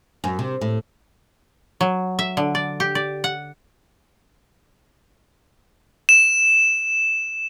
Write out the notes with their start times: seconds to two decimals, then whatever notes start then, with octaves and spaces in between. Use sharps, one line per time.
0.24 F#2
0.39 C3
0.61 A2
1.81 F#3
2.19 E5
2.37 D3
2.55 D5
2.80 G4
2.95 D5
3.24 F#5
6.09 E7